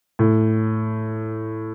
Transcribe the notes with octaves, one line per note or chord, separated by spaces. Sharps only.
A2